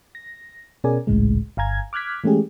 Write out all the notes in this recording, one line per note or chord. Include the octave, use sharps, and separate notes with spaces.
A#6
B2 C#4 G#4 A#4 D5 G#5
G#1 C#2 A2 C#3 G#3
G1 F5 G#5 A#5 G#6
D6 F6 F#6 G#6 B6
E3 G#3 A3 C#4 G4 G#4